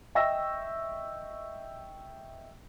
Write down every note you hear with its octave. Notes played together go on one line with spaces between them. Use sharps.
D#5 E5 G5 C#6 E6 A#6